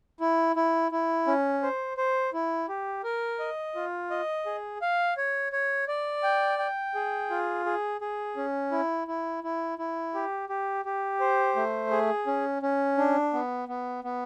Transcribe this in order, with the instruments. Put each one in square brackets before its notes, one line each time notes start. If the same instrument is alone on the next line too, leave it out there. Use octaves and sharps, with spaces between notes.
[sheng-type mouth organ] E4
E4
E4
C#4
C5
C5
E4
G4
A#4
D#5
F4
D#5
G#4
F5
C#5
C#5
D5
G5
G5
G#4
F4
G#4
G#4
C#4
E4
E4
E4
E4
G4
G4
G4
C5
A3
G#4
C#4
C#4
D4
B3
B3
B3